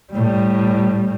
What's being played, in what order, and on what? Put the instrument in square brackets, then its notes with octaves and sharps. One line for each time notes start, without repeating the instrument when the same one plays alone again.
[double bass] A2 G3